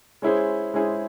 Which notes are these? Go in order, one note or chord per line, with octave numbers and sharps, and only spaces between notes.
G#3 C#4 E4 G#4 C5
G#3 C#4 E4 G#4 C5